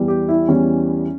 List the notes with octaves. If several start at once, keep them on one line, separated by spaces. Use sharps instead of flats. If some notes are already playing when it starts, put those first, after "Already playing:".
Already playing: E2 E3 G3
G4
E4
E2 E3 G3 C#4